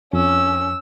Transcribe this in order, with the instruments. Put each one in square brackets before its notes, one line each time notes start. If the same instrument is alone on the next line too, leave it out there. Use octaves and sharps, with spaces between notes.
[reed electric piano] F2 [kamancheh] C#4 E6